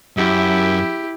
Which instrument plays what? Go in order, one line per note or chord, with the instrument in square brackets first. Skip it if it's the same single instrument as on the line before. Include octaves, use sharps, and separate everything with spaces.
[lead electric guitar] F#2 [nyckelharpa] E4 G4